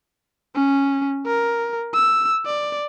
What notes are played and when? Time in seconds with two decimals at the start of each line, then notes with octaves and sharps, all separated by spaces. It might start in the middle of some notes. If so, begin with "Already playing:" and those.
0.56 C#4
1.26 A#4
1.94 E6
2.46 D5